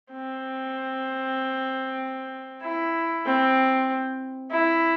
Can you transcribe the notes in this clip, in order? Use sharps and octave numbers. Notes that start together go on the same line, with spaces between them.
C4
E4
C4
E4